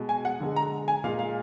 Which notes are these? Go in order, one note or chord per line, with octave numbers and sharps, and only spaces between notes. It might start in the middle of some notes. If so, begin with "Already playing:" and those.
Already playing: B2 G#3
G#5
F#5
D3 G#3
A#5
G#5
A#2 G#3 F5
F5